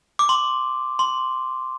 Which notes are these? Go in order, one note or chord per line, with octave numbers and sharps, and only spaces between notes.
D6
C6
C6